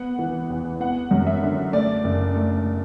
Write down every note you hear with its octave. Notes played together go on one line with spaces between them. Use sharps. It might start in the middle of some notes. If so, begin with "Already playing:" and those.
Already playing: B3 F#5
E3
E2
B3 F#5
F#2
E5
D3
A3 D5
F#1
A3